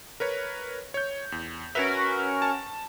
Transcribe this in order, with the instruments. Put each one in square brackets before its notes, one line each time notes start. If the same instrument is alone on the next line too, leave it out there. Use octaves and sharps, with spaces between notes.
[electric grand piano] A#4 B4 C#5
C#5 G6
E2
[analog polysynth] C#4 F#4 A#4 [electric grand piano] B4 E5
[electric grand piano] A5